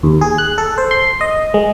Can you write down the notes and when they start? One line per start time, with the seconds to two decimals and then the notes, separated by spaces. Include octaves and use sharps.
0.03 D#2
0.21 G#4
0.38 F#6
0.58 A4
0.78 C5
0.91 C6
1.21 D#5
1.54 G#3